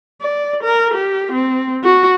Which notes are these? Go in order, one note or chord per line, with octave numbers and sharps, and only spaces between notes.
D5
A#4
G4
C4
F#4